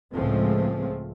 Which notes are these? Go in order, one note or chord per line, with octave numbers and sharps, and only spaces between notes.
C#2 A2 F3 G#3 A3 C4